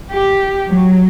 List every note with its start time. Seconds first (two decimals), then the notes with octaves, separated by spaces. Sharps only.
0.13 G4
0.67 F#3